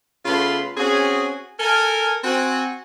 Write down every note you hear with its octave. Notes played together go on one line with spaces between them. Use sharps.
C#3 A3 B3 F4 B5 C6
C4 C#4 F#4 G#4
A4 A#4 G#5
C4 F#4 G#5